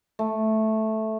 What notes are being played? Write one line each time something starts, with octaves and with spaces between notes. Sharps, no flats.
A3